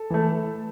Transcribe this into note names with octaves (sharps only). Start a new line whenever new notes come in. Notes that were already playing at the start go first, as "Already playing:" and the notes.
Already playing: A4
E3 A3